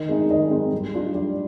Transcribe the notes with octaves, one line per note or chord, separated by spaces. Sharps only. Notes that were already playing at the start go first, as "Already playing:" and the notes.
Already playing: D#3 D#5
G#3 C4 D#4
D#3 D#5
G#3 C4 D#4
G3
D4 F4
G3 D5